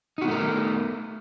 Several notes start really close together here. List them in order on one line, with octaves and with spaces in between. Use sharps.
D#4 F#4 B3 A3 A#4